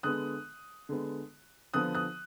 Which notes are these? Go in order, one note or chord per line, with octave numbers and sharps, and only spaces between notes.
D3 G#3 B3 D#6 F#6
D3 G#3 B3
D3 F3 B3 D#6 F#6
D#6 F#6